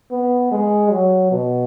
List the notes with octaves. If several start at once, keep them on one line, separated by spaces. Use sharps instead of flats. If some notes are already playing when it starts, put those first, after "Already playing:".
B3
G#3
F#3
B2